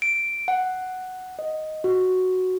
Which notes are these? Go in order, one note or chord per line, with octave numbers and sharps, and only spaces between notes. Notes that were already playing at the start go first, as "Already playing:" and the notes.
D7
F#5
D#5
F#4